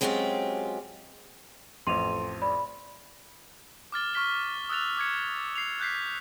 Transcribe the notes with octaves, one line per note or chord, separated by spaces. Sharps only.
F#3 G#3 C4 C#4 F4 G4
A1 F2 A3 C6 D#7 F7
D5 B5
D6 F6 A6 G7
C#6 F6 B6 G7
D#6 E6 F#6 A6 F7
D6 G#6 C#7
C7 F7
F#6 G6 B6 C7